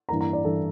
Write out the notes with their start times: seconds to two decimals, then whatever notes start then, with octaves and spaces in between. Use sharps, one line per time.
0.09 G2 E3 A#3 A#5
0.20 A#5
0.33 D5
0.44 G2 E3 A#3 A4